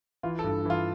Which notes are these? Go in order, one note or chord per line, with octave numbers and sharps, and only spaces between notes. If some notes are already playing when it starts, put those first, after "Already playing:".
E3 F4
A4
G2
E3 F4